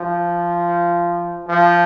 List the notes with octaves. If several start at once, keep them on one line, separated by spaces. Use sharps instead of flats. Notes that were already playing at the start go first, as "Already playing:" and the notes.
Already playing: F3
F3